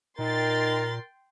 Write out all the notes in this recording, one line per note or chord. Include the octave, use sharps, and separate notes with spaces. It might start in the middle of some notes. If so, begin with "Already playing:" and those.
A#2 D#4 A#4 G5 C6 A6